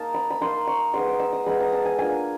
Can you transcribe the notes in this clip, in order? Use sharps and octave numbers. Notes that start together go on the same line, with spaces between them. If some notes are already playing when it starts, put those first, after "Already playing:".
Already playing: A#3 D#4 A5
B5
B5
A#3 D#4 C6
C#6
G#3 B3 D#4 C6
D6
E6
D#6
G#3 B3 D#4 B5
A#5
A5
G#5
A#3 D4 F4 G#5